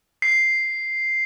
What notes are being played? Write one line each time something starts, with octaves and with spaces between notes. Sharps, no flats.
C7